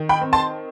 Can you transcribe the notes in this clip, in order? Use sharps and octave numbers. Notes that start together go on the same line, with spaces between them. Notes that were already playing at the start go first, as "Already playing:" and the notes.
Already playing: D#3
G5 B5
C4
A5 C6